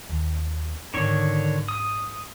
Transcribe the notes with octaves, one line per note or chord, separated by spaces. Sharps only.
D#2
G#2 D3 D#3 C#5
D#6